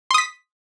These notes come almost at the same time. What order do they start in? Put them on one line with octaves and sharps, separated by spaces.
C6 D#6 B6